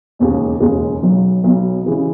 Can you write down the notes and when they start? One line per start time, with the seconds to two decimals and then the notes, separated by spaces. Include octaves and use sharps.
0.19 E1 D#2 C#3 G#3
0.60 E1 D#2 C#3 G#3
1.03 B1 B2 F#3
1.44 B1 B2 F#3
1.86 C#3 E3 G#3